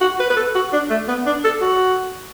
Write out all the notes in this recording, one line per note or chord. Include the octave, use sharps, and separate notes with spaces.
F#4
B4
B4
A4
F#4
D4
A3
B3
D4
A4
F#4